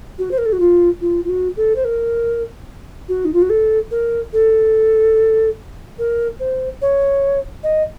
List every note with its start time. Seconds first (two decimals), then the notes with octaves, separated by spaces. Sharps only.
0.19 F#4
0.31 C5
0.38 A#4
0.46 A4
0.52 F#4
0.60 F4
1.01 F4
1.24 F4
1.29 F#4
1.57 A4
1.76 C5
1.85 A#4
3.09 F#4
3.25 D#4
3.33 F4
3.42 F#4
3.50 A4
3.91 A#4
4.33 A4
5.99 A#4
6.40 C5
6.82 C#5
7.63 D#5